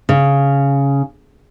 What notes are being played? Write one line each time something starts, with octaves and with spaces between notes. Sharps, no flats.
C#3